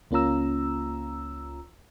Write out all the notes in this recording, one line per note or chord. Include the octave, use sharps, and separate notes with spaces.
C#2 A#3 C#4 F4 A#5 E6